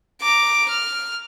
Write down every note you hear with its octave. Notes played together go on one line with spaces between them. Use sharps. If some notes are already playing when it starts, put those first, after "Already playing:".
A#5 D6
F6